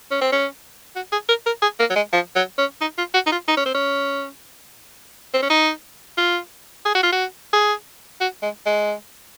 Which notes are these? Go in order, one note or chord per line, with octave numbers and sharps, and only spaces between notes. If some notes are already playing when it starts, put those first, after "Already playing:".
C#4
C4
C#4
F#4
G#4
A#4
A#4
G#4
A#3
F#3
G#3
F3
F#3
C#4
D#4
F4
F#4
D#4
F4
D#4
C#4
C4
C#4
C4
C#4
D#4
F4
G#4
F#4
F4
F#4
G#4
F#4
G#3
G#3